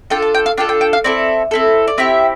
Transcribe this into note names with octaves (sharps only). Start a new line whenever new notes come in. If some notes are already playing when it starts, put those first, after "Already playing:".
D4 F4 A4 G5
A5
G5
F5
D4 F4 A4 G5
G5
G5
F5
C4 E4 A4 D5
C4 E4 A4
D5
C4 E4 G4 E5